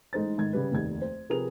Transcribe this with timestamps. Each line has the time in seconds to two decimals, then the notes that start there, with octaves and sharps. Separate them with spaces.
0.13 A1 G#3 D#4 C5 A6
0.38 G#2 D#3 G#6
0.53 C#3 G3 B4
0.72 F1 D#2 G#6
1.02 C5
1.30 C3 F3 G#4 A#4 B4 F7